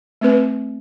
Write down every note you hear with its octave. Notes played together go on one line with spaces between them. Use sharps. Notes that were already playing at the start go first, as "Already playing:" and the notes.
A3 C4 B4